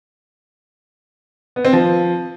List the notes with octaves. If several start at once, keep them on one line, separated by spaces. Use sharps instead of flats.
B3
C4
F3